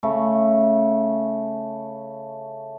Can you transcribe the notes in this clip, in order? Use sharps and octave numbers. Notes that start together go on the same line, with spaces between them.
C#3 A3